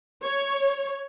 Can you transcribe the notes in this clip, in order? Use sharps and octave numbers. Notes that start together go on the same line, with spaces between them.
C#5